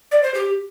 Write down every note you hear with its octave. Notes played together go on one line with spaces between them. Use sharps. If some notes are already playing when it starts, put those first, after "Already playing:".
D5
C5
G4